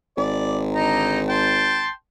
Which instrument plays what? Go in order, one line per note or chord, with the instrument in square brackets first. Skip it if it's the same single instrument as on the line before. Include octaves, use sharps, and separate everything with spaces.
[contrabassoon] G#1 [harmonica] D5
[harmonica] D3 D#4 A#5
G5 A5 C6